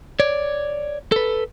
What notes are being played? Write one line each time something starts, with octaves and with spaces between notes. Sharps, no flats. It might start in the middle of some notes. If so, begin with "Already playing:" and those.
C#5 D5
A4 B4